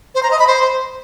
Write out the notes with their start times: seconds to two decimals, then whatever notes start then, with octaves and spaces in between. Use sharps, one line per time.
0.15 C5
0.23 A#5
0.31 D#5
0.39 B5
0.47 C5